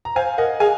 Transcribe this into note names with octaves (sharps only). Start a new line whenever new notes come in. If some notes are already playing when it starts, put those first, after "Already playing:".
A#5
C5 F5 G#5
A#4 D#5 F#5
G#4 F5 G#5